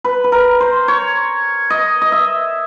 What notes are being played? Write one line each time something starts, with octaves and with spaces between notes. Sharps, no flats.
B4
B4
A#4
C5
C#5
D#5
D#5
E5